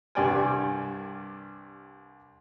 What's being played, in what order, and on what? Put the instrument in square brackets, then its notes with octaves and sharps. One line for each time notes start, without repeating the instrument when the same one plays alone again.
[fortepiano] C2 G2 G3 D5 G5 G#5